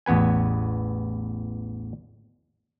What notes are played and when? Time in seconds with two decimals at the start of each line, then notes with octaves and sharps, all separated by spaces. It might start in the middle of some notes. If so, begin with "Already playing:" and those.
0.06 A1 E2 B3 B4 G#5